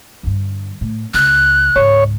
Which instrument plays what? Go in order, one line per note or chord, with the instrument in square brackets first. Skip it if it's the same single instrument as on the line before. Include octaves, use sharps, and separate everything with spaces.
[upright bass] G2 D3
A2
[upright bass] C#2 [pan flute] F#6
[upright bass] C#2 G#2 [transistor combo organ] C#5